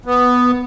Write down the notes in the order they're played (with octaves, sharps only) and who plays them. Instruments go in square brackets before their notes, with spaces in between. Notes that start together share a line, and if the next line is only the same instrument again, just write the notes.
[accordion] B3